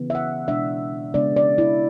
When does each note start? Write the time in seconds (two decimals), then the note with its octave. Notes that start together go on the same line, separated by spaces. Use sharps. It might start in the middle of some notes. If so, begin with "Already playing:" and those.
Already playing: C#3 E3 B3
0.10 E5
0.15 F#5
0.48 B2 G#3 D4 E5
1.14 C#3 G#3 B3 D4 D5
1.37 D5
1.58 E4